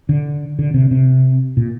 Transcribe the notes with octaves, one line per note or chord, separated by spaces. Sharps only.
D3
D3
C3
C3
A#2